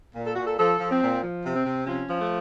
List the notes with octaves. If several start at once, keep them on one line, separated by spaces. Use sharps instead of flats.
A#2
A4
A#2 F#4
A4
F3 A4
F3
C4
A#2
F3
C3
C4
C3
F3 C#4
F3
A3